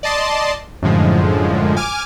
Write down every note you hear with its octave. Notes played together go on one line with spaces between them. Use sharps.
D5 D#5 A5 C6
F#2 A2 D3 F3 G#3
G#5 D6 F6